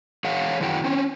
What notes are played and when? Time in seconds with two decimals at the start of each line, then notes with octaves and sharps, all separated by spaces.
0.24 E3 G#4 C#5 F5 F#5
0.60 F#2 D#3 E4 F#4 G5
0.84 C4 C#4